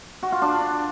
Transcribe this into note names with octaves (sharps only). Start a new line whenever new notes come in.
F#4
F4
D4